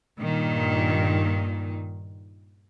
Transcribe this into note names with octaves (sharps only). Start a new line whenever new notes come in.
G2 A#2 D#3